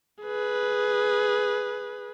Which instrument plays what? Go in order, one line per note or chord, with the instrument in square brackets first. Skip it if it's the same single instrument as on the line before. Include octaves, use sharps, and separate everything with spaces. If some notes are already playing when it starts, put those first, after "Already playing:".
[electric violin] G#4 B4